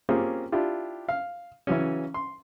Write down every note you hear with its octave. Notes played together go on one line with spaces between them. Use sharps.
A#3 C4 C#4 F4 G4 G#4
D4 E4 F4 G4
F5
C#3 E3 F#3 C#4
C6